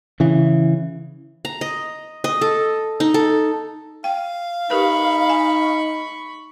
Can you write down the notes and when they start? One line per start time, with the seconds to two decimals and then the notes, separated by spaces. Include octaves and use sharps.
0.20 C#3 E3
1.45 A#5
1.61 D#5
2.24 D#5
2.41 A4
3.00 D#4
3.14 A4
4.04 F5 G5
4.70 D#4 G4 A#4 B4 B5 C#6
5.30 G#5